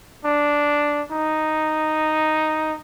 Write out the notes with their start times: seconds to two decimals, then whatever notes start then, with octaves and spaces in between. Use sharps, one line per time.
0.25 D4
1.11 D#4